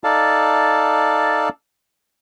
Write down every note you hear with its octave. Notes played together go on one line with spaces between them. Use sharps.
D#4 A4 D5 F5 A5